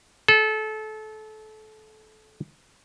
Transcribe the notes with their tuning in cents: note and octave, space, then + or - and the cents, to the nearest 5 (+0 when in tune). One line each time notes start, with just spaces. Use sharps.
A4 -25